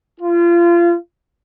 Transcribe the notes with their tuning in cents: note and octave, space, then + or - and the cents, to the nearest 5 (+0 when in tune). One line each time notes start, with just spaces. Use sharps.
F4 -30